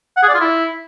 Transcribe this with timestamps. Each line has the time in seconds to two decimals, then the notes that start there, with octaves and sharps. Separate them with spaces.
0.17 F#5
0.23 G#4
0.29 D5
0.34 F4
0.40 E4